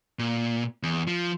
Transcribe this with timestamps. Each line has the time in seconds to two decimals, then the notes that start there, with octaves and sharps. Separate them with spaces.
0.19 A#2
0.83 E2
1.07 F3